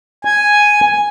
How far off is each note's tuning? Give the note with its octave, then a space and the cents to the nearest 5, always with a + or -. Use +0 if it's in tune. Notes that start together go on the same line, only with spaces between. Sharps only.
G#5 +0